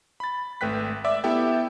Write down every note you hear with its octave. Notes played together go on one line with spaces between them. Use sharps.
B5 A6
G#1 A3 B4 G5 F#6 B6
D5 E5 D6 E6
B3 E4 G4 A4 E5 G5